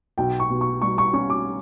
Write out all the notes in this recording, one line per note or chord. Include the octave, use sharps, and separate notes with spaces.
B1 G5
C#6
B2
C#6
G3 C#6
C#6
C#4 C#6
D6